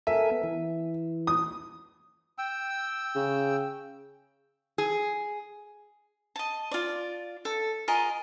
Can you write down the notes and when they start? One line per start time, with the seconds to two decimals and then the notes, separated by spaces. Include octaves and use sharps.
0.07 A4 A#4 E5 G#5
0.31 B3
0.44 E3
1.27 D#6
2.38 G5 E6
3.15 C#3
4.78 G#4
6.36 D#5 A5
6.71 F4 D5
7.45 A4
7.88 F4 G#4 A#4 D#5